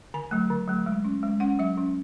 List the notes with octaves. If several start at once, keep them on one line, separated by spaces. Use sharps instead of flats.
D3 G#5
F#3 A3
D3
F#3 A3
G#3
C#4
G#3
C#4 F#5
F#3 E5
C#4